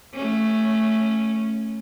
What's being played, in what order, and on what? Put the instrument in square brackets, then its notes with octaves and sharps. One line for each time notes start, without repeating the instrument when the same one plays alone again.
[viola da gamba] A3 C#4